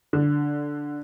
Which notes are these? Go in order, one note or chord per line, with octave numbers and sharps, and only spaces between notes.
D3